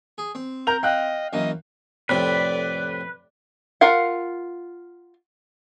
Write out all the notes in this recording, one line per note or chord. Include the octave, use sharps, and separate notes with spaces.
G#4
C4
A#4 A#5 G6 F7
D#5 F5 G5 F#6
F#2 E3 A#3 D#5
F2 A2 C3 B4 D5
F4 A#4 F5 F#5